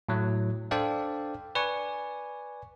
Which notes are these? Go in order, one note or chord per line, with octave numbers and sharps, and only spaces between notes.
A2 F#3 A3
D4 A4 C5 D5 F5 G5
B4 D5 G#5 C#6